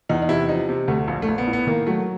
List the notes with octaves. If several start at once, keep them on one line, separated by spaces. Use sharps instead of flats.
E2 D#4
D#4
C3 E4
F3 D#4
C3
D2 A3
A#1
A3
A#1
B3
A2
B3
D#3 A#3
F#3 A3